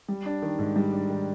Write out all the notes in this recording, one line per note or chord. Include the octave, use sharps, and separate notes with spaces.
G3
D4
D#3
G#2
G3
D4
D#3